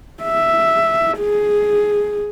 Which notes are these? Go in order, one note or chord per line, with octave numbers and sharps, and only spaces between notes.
E5
G#4